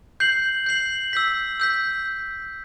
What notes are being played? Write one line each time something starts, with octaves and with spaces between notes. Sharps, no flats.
G6 C7 F#7
G6 C7 F#7
E6 G6 B6
E6 G6 B6